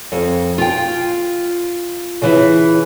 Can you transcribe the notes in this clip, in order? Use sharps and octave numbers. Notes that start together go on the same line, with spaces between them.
F2
F4 G5
C#3 E3 E4